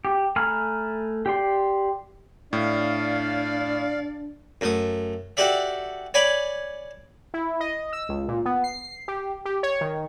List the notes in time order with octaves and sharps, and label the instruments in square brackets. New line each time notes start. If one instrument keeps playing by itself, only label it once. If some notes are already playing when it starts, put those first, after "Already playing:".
[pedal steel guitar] G4
A3 G#5 A#5 B5 F6
G4 D5 C6
[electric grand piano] A2 [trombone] D4 [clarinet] D5 [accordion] F5
[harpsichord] F#2 A3 D#6
F#4 G4 A4 D5 E5
C#5 D5 G#5 B5
[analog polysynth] E4
D#5
E6
C#2
A#2
B3
C7
G4
G4
C#5
D#3